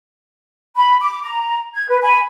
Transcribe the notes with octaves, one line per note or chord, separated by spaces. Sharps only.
B5
D6
A#5
G#6
B4
G#5 B5